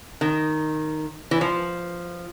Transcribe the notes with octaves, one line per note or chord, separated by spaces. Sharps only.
D#3
E3
F3